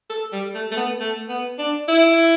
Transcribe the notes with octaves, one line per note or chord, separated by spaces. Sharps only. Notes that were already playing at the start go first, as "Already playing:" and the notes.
A4
G3
A3
A3
B3
A3
B3
D4
E4